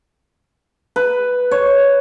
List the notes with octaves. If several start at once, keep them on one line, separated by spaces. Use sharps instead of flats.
B4
C#5